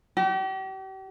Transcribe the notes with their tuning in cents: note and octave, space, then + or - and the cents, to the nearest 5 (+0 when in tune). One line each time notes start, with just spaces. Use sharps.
G4 -40